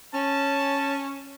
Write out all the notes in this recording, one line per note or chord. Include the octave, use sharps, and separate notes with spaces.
C#4 A5